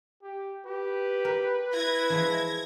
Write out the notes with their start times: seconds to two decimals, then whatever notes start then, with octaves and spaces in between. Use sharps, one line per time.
0.23 G4
0.66 G4 B4
1.25 A#4
1.74 E4 G#6 A#6
2.10 E3 F3 G#3